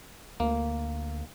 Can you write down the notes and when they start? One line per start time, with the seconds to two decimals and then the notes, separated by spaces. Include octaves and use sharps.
0.40 D2 A#3